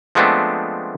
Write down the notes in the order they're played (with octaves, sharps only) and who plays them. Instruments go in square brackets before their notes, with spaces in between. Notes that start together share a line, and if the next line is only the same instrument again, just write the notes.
[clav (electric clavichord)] F3 G#3 A3 B3 C4 D4